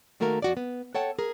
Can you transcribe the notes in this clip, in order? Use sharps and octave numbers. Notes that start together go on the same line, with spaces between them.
D#3 A3 A#3 F#4 A#4
F2 F#4 D5
B3
A4 C#5 F#5 G5 A5
G#4 A#4